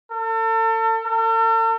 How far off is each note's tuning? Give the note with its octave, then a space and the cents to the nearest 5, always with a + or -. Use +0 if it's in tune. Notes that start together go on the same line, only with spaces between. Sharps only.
A4 +40
A4 +45